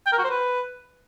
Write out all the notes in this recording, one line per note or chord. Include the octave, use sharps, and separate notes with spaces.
G5
A#4
F#4
C5
B4